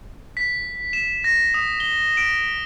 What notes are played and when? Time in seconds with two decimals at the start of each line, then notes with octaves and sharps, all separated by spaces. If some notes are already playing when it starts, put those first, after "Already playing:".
0.37 B6
0.93 E7
1.24 A#6
1.54 D#6
1.80 G7
2.17 D7